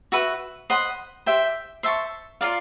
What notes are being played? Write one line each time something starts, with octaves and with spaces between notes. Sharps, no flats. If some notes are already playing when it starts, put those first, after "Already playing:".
F#4 B4 E5
C5 D#5 F#5 B5
G4 C5 E5 G5
C5 E5 A5 C#6
F4 A#4 D5 F5